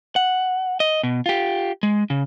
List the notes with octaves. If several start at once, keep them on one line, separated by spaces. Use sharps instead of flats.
F#5
D#5
B2
F4 G4
G#3
C#3